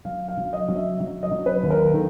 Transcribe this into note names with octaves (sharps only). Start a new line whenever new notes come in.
F#3 F5
F5
F#3
D#5
F#3
E5
F#3
D#5
F#3
B4
D#2
A#4
D#3 A4